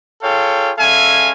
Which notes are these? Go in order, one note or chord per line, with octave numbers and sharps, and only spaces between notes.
F4 G#4 A4 C#5 F5 G5
G#3 C#4 A4 E5 F5 G#5